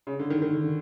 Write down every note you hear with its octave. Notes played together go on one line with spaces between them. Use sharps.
C#3
D3
D#3
D#3
D3